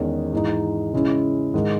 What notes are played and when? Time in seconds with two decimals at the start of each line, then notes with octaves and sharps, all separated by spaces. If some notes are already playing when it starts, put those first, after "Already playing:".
Already playing: E2 D#3 G#3 C#4
0.33 G#2 E3 G#3 D#4
0.93 C#3 G#3 C#4 E4
1.54 G#2 D#3 G#3